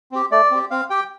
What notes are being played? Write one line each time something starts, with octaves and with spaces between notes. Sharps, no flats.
C4 G4
A3 D5
C4 G4
C4 F5
G4 G5